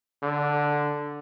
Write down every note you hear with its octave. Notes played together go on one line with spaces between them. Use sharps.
D3